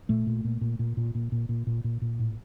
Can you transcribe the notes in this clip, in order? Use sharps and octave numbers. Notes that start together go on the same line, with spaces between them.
A#2 A3
A#2
A#2
A#2
A#2
A#2
A#2
A#2
A#2
A#2
A#2
A#2
A2